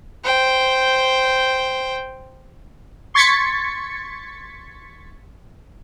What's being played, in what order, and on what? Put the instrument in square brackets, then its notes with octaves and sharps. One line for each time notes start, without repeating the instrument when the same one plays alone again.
[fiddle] C5 G5
[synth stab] C6 C#6 G#6 A6 B6 C#7